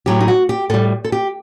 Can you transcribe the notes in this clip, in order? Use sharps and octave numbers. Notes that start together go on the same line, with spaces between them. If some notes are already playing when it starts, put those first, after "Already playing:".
A2 F#3 G4
D#4
F#4
G4
A2 G3 A4
A4
G4